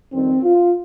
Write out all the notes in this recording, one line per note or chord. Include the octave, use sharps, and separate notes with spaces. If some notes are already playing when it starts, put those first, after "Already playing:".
F2 D#3 G3 C4
F4